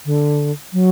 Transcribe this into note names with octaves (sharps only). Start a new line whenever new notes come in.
D3
F#3